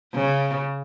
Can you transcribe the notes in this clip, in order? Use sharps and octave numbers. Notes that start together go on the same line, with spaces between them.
C#3